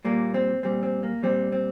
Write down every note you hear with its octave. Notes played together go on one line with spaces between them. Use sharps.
A#2 G3 A#3
C4
A#2 G3 C4
C4
A#3
A#2 G3 C4
C4